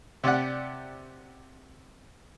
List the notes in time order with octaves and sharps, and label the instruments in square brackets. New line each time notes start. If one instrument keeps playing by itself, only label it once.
[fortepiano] C3 G4 D5 F#5